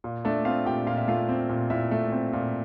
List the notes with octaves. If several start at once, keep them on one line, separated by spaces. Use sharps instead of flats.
A#2
A3 D4 D5
C4 F4 F5
A#2 G4 G5
A#2 F5
E5
A3 F4 F5
C4
A#2
A#2 E4 E5
A3
C4
A#2